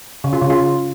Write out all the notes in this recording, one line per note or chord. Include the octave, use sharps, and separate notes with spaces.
C#3
F4
C#3
F4